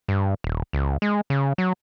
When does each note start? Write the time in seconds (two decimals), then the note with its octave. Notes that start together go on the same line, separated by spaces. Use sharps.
0.08 G2
0.44 D#1
0.73 C#2
1.02 G#3
1.30 C#3
1.58 F#3